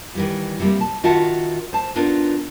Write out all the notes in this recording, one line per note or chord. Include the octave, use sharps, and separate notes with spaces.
D#3 E3 G3
C3 G3 A#3
A5
D#3 F4 F#4 E5 F#5 A5
C5 A5
B3 D4 D#4 F4 A#4